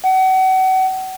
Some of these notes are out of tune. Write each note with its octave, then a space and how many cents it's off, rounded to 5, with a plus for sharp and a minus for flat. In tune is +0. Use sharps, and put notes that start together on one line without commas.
F#5 +35